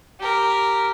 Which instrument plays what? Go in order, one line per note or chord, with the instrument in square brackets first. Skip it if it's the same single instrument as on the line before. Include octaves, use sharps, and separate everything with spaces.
[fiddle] G4 A#4